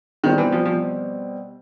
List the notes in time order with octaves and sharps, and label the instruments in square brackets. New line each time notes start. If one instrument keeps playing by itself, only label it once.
[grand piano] B2 G3 C4 [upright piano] D#3
[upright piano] E3
F3
F3